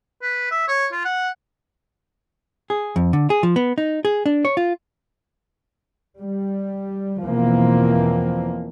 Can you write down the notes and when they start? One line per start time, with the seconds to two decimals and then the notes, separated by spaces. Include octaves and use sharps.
0.22 B4
0.51 E5
0.68 C#5
0.92 F4
1.05 F#5
2.70 G#4
2.96 F2
3.13 D3
3.30 G#4
3.43 F3
3.56 B3
3.78 D#4
4.05 G#4
4.26 D4
4.45 C#5
4.57 F4
6.19 G3
7.23 E2 B2 E3 F3 A#3 C4